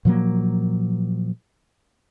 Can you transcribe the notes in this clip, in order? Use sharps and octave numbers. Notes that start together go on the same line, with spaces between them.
A#2 F3 F#3 A#3